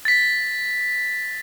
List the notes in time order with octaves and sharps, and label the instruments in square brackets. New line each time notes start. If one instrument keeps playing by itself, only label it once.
[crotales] A6 B6